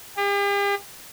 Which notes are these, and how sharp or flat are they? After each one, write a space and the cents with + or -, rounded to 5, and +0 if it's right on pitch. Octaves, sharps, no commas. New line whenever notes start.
G4 +45